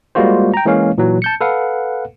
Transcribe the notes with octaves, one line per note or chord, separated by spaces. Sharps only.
G3 G#3 A#3 F4 F#4 C5
G5 A#5
E3 G#3 A#3 C#4 C#5 F5
A#2 E3 F#3
A5 G6 C#7
A4 B4 F5 F#5